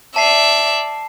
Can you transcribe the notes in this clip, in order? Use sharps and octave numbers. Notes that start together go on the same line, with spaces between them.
D5 E5 A5 C7